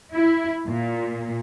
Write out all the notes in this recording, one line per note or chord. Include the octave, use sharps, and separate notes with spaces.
E4
A#2